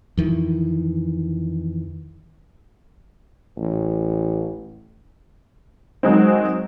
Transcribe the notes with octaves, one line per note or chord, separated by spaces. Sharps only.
F2 D#3 E3
A1
D#3 F#3 G#3 C4